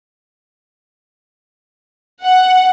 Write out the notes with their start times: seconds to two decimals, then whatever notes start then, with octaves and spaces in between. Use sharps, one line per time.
2.24 F#5